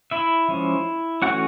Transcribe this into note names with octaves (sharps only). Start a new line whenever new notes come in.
E4 E5
F3 G#3 C#4
E3 A3 C#4 F#4 F#5